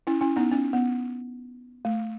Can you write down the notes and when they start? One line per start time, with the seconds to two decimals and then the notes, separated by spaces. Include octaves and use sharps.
0.07 C#4 E4
0.21 C#4 E4
0.36 B3 D#4
0.52 C#4
0.73 B3
1.85 A3